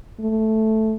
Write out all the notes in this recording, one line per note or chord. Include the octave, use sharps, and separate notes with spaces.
A3